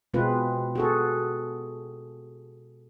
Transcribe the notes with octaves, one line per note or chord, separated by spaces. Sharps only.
B2 G#3 C4 F4 B4
F#4 G#4 A4